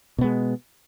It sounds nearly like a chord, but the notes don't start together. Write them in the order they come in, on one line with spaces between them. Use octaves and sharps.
B2 B3 G#3